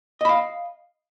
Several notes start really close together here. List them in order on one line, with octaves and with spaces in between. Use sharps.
D#5 B5 F5